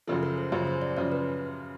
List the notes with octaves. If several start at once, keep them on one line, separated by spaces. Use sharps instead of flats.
F#2 C#3 F3 A4
A#4
C5
F#2 C#3 F3 C#5
C5
D5
F#2 C#3 F3 C#5
B4